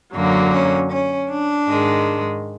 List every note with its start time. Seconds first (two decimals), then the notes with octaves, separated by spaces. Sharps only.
0.14 F#2 D3 F#3 A#3
0.53 C#4
0.91 C#4
1.29 D4
1.68 G#2 D#3 G#3